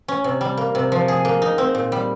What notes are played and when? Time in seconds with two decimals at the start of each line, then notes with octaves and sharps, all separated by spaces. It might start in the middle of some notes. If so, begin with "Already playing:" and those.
0.08 C#4
0.24 C3
0.41 G3
0.57 A#3
0.75 C3
0.92 F3
1.08 G#4
1.25 A#3
1.42 D#4
1.58 C4
1.75 A#2
1.92 G3